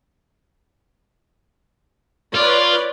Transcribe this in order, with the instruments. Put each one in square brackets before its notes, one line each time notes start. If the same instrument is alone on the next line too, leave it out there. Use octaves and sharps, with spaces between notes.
[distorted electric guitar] F4 [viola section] B4 C#5 D5